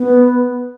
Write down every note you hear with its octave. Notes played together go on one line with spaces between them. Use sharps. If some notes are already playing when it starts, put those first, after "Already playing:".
Already playing: B3